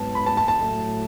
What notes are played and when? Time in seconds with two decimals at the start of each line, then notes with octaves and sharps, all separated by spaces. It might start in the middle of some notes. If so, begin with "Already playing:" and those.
Already playing: G#2 F#3 B3 A5
0.15 B5
0.26 A5
0.37 A5
0.48 A5
0.58 A2 F#3 A3